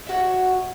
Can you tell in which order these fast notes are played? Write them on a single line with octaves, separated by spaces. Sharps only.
E5 F#4 C#5